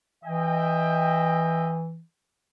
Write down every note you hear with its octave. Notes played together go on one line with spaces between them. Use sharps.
E3 D#5 E5 G5